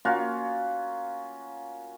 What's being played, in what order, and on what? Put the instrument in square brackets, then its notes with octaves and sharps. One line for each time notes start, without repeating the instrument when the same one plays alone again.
[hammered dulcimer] A#3 C#4 F4 F#4